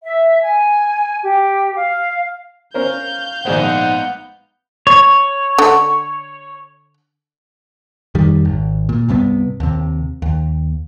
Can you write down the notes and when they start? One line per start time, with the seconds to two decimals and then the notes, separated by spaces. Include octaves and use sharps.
0.02 E5
0.39 G#5
1.22 G4
1.73 F5
2.74 C#4 A#4 C5 F5 G6
3.45 A#1 G#2 B3 D#4 G#4 C5 F#5
4.87 C#5
5.58 D3
8.15 F2 D#3 G3
8.45 G#1
8.89 A#2
9.08 C2 G2 C3 B3
9.60 D#2 C3
10.22 D#2